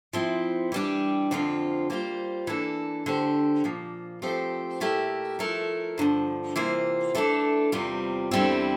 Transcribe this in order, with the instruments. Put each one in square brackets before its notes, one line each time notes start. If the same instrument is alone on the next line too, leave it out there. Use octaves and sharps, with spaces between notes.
[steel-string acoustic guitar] F3 C4 E4
E3 G3 D4 G4
F2 D3 F3 C4 F4
G3 A#3 F4 C5
E3 A#3 D4 A4
D3 A3 D4 G4 C5
A#2 F3 A#3
F3 A3 C4 G4 C5
A#2 A3 E4 G4 A#4
F3 A3 E4 A#4
G2 D3 F3
C3 E3 A#3 F4 C5
E3 A3 D4 A4
E2 C3 G3 C4 F4
E2 D3 G3 C4 E4